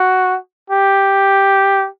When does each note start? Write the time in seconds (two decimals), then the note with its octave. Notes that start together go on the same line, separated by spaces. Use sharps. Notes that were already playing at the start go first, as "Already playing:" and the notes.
Already playing: F#4
0.70 G4